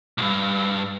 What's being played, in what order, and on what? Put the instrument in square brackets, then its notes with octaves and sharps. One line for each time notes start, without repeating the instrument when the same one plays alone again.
[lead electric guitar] C2 G2